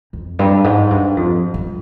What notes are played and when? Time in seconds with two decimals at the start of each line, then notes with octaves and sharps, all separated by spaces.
0.13 F2
0.39 G2
0.64 G#2
0.91 G2
1.17 F2
1.54 G2